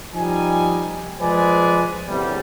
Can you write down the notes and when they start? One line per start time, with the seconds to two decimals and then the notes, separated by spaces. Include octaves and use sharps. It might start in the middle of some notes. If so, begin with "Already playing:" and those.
0.14 F3 G3 D#4 G#5
1.19 F3 G#3 B4 C5 D5 G#5
2.07 G1 E2 A2 C3 G3